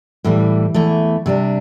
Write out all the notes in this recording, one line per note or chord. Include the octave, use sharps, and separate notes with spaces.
A2 E3 G3
E2 E3 A3
C3 G3 D4